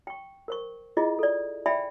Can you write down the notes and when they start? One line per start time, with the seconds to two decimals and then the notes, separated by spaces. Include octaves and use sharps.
0.07 G5 C#6
0.48 A#4 C5 C#6
0.97 E4 F4 G#4 D#5
1.19 A4 D5
1.66 D5 E5 G5 G#5 B5